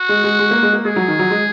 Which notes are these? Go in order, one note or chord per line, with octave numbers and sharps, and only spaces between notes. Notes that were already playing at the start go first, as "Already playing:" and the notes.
Already playing: F#4
G#3
G#3
G#3
A#3
G#3
A#3
G#3 G#4
F#3
D#3
F#3
G#3